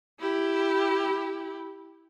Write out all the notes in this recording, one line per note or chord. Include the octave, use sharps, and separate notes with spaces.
E4 G4